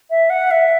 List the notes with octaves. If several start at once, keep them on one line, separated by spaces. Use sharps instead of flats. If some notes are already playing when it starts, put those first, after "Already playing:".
E5
F#5
E5